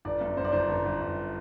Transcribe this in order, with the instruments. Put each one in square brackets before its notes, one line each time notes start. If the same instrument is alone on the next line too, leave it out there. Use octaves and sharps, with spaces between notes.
[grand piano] G1 D5
F#2
F#2 C5
D5
G1 C5
G1
G1
G1